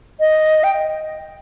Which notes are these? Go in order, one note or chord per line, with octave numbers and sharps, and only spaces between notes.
D#5
G5